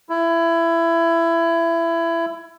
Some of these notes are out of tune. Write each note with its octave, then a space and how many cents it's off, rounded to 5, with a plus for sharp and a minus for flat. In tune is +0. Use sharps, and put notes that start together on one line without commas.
E4 +20